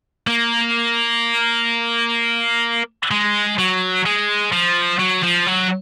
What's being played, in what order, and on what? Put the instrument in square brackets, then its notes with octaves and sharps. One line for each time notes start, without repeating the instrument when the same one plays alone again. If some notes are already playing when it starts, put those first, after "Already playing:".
[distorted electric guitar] A#3
G#3
F#3
G#3
F3
F#3
F3
F#3